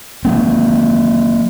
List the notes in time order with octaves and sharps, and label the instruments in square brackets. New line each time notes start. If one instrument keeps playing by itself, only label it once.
[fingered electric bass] F#3 A#3 C4